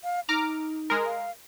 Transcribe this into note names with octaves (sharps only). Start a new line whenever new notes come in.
F5
D#4 A#5 D6 F6
G#3 A#4
F5